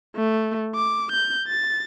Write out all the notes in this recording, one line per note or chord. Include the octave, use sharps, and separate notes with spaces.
A3
D6
G6
A6